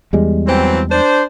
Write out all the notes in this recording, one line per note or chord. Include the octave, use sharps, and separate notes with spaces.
E2 G3 G#3
E3 F#3 C4
D4 C5